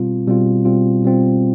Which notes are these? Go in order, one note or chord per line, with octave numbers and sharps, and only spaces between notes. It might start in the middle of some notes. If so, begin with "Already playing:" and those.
Already playing: B2 G3 C4 F4
B2 G3 C4 F4
B2 G3 C4 F4
B2 G3 C4 F4